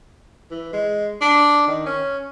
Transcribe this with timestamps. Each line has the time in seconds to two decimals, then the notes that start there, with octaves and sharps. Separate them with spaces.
0.51 E3
0.73 G#3
1.21 D4
1.67 D#3
1.86 C#4